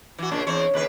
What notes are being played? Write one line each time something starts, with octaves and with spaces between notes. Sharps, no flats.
E3 F#4
A#2 C#3 D4
E2 C4 C#5
D#2 C#3 B4